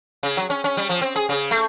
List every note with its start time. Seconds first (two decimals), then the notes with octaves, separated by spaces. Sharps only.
0.23 C#3
0.37 F#3
0.50 C#4
0.64 C#4
0.77 G3
0.89 F3
1.02 C4
1.16 G#4
1.29 C#3
1.51 A3